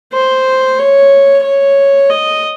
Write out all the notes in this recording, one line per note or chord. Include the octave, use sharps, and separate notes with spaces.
C5
C#5
C#5
D#5